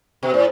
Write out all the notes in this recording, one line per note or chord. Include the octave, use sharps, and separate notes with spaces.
B2
A2